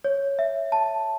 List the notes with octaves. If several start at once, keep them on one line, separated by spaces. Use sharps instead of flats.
C#5
E5
A5